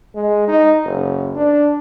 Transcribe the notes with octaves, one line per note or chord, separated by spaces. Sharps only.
G#3
D#4
F#1
D4